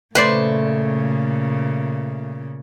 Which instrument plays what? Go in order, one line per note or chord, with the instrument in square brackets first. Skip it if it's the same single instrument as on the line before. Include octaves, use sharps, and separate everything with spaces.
[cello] A#2 C#3 [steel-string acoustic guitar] A3 [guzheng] B4 C5 D5